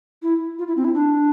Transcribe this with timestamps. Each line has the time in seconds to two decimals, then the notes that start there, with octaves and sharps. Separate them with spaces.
0.23 E4
0.59 F4
0.68 E4
0.77 C4
0.84 E4
0.94 D4